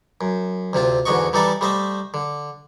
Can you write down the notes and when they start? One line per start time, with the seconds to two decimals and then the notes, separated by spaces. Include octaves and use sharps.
0.21 F#2
0.73 D2 C3 C4 F4
1.05 E2 G#2 D3 F#4 D#5 C#6
1.33 E3 G3 D#4 A4 D5 E5
1.61 G3 A3 C5 D#5 E5
2.14 D3